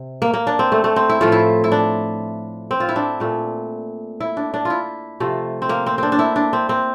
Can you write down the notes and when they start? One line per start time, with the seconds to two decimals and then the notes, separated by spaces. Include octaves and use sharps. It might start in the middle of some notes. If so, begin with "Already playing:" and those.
Already playing: C3
0.22 A#3
0.34 A#3
0.47 D4
0.59 C4
0.72 A3
0.84 A3
0.96 C4
1.09 E4
1.21 A2 F3 A3 F4
1.32 E4
1.64 E4
1.72 D4
2.71 C4
2.80 F4
2.89 E4
2.96 D4
3.20 A#2 A3
4.20 E4
4.37 D4
4.54 D4
4.65 E4 F4
5.20 C3 F3 A3
5.62 C4
5.69 A#3
5.86 C4
5.98 C4 D4
6.12 D4
6.19 E4
6.36 D4
6.53 C4
6.69 C4